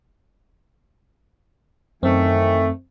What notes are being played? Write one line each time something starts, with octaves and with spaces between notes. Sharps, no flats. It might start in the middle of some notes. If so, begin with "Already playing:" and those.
F#2 D#3 E3 A3 C4